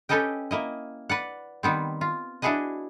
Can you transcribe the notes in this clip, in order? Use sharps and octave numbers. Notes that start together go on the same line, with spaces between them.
C#4 G4 A4 B4 D#5 G5
A#3 E4 D#5
B4 D5 F#5
D#3 G3 B3 C4
F4
D4 E4 F#4 G#4 B4 D#5